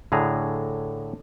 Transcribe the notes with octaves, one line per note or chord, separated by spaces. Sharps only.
A2 D3 G#4 A#5